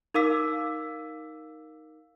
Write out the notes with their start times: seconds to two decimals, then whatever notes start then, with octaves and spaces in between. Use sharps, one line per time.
0.14 D#4 A#4 F5 D6 E6 B6